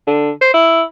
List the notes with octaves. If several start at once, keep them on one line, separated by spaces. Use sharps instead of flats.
D3
C5
E4